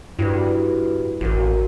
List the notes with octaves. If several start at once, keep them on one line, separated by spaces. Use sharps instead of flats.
G2 E4 F#4 B4
A1 F#4 A#4